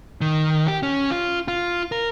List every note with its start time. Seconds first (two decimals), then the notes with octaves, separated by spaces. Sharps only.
0.21 D#3
0.68 G4
0.83 C#4
1.10 F4
1.48 F4
1.92 A#4